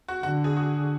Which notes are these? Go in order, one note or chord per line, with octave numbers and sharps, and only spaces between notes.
F#4
D3 F#4
G#4
F#4